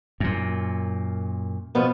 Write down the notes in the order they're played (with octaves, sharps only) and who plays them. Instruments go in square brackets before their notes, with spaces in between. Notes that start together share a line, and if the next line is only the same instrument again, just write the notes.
[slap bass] F#2 A#2
[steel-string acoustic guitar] B2 F3 B3